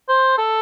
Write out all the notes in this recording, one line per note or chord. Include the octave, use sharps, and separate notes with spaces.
C5
A4